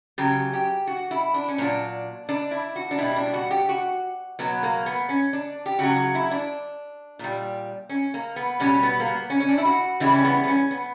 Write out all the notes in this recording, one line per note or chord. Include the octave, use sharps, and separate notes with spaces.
C#3 F#3 G4
G4
F#4
E4
D4
C#4
A#2 F#3 D4
D4
E4
F#4
D4
B2 G3 E4
D4
F#4
G4
F#4
B2 F#3 B3
A#3
B3
C#4
D4
G4
C#3 F#3 F#4
F#4
E4
D4
A#2 G3
C#4
A#3
B3
B2 G3 C#4
B3
A#3
B3
C#4
C#4
D4
E4
F#4
C#3 E3 G3 E4
C#4
B3
B3
C#4
B3